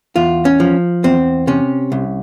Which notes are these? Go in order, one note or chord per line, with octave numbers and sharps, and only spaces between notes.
E2 F4
C#4
F3
E2 C4
C3 C#4
C2